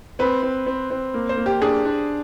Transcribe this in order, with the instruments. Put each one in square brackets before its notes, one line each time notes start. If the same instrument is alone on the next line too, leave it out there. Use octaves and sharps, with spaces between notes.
[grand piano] C4 [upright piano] B4
[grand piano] C4
C4
C4
A#3
[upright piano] C5
[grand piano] A#3
[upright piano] G4
[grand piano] D4 [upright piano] G#4
[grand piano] D4